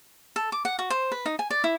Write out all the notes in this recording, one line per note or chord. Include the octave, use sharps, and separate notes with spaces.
A4
D6
F#5
F#4
C5
B4
D#4
G#5
D5
E4